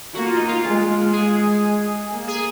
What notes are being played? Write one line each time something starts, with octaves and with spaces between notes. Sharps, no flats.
A#3 F#4
F4
D#4
F4
G#3
G#4
A#3
G#4